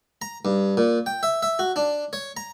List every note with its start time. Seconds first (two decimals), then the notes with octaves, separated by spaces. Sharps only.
0.22 A#5
0.45 G2
0.77 A#2
1.06 G5
1.23 E5
1.42 E5
1.59 F#4
1.76 D4
2.13 C#5
2.37 A#5